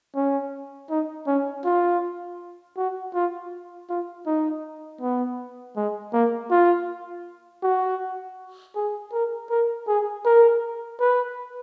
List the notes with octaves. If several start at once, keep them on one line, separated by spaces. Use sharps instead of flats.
C#4
D#4
C#4
F4
F#4
F4
F4
D#4
B3
G#3
A#3
F4
F#4
G#4
A#4
A#4
G#4
A#4
B4